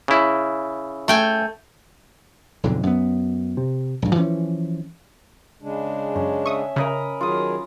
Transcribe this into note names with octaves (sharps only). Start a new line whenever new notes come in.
C#3 E4
A3 G5 G#5
B1 F2 G#2 D3
F#2 B3
C3
A#1 G2
E3 F3 A3 C#4
C#3 G#3 D4
F#2 C#4
E5 C#6 D#6
C#3 A#4 D#5 B5
D#3 F#3 F4 G#4 D#6